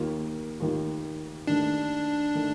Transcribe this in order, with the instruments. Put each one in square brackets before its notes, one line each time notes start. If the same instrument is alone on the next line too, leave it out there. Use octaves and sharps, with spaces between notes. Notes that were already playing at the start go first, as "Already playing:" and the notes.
Already playing: [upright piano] D#2 D#3 A#3 F4
D#2 D#3 A#3 F4
[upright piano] D#2 D#3 A3 [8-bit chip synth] D4
[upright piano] D#3 A3